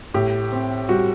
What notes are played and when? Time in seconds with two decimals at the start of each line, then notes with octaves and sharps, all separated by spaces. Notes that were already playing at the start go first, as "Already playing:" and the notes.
0.14 A2 G4
0.52 C4
0.89 G3 F#4